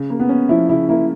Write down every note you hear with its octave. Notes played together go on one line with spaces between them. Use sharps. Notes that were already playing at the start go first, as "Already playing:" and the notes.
Already playing: C#3
A#3
B3
C#4
F3 E4
C#3 E4
A#3 E4